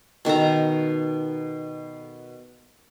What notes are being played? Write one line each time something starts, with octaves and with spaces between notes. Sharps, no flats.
B2 D#3 A4 A#5